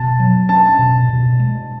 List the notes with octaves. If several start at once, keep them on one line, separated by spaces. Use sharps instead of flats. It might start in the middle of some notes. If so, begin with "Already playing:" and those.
Already playing: B2 A5
F#3
C#4 A5
B2
B2
G#3